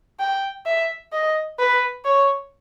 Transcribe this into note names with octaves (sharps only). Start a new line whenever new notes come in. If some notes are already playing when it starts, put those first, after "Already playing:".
G5
E5
D#5
B4
C#5